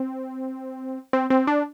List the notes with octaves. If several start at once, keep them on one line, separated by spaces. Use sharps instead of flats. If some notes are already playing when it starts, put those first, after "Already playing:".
Already playing: C4
C4
C4
D4